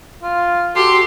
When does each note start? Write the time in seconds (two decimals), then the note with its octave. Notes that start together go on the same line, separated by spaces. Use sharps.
0.23 F4
0.76 F#4 G4 A4 C6